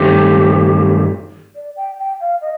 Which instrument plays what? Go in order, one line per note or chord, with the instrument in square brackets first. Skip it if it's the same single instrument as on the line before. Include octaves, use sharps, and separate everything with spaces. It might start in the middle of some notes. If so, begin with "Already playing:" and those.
Already playing: [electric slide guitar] G2 D#3 A3 C4 [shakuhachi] G4
[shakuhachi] D5
G5
G5
F5
D#5